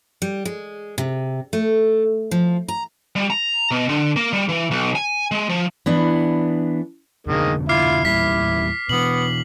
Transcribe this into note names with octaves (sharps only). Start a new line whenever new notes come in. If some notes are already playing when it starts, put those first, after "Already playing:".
G3
G#3
C3
A3
F3
A#5
G3
A#5
B2
D3
A#3
G3
E3
B1
G#5
G#3
F3
E3 B3 D4
F1 B2 D3 D#3 G#3 A#3
E4 F4 D6 F6 C7
E2 A#2 G3 E4 B6
B2 E3 B3 F#7